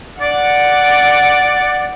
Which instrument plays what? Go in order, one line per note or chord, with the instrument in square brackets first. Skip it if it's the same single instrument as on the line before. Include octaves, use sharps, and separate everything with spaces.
[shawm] D5 [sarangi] F#5